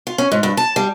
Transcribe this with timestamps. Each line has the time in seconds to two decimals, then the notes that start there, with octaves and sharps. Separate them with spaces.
0.07 F4
0.18 C#4
0.32 G#2
0.43 G2
0.57 A5
0.76 G3